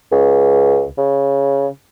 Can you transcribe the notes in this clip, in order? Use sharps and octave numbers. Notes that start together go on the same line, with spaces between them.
C#2
C#3